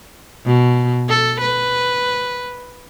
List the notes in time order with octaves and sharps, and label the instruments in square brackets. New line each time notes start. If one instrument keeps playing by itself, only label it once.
[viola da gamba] B2
A4
B4